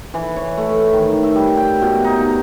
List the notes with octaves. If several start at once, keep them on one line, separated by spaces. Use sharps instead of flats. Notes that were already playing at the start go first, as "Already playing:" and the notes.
E3
C#5
A3
D#3
E5
G3
G5
B2
D#4
A#5